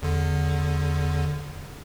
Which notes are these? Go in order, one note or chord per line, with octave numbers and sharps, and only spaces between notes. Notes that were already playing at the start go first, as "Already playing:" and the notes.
E2 D3